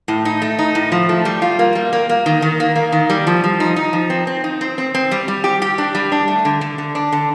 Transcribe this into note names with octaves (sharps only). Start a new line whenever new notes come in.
A2
D#4
A3
D#4
A2
F3
A3
G3
F4
A#3
G3
A#3
A#3
D#3
D#3
A#3
A#3
D#3
G3
F3
F3
D#4
D#4
F3
C4
C4
D#4
C4
C4
C4
G3
G3
G4
G4
D4
G3
D4
A3
D3
D3
D3
D4
D3